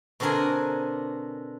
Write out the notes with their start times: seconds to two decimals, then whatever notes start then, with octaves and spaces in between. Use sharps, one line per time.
0.20 B2 D3 C4 D4 A#4 G#5